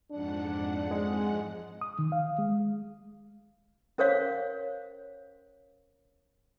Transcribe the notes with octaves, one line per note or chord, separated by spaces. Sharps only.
F2 G#2 D4 F#5
G#3
D#6
D#3
F5
G#3
C#4 A#4 C5 C#5 F5